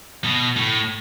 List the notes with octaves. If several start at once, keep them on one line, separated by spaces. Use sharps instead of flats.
B2
A2